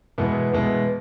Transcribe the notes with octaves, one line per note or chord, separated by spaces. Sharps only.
E2 B2 G#3 B3 E4
E2 B2 G#3 B3 E4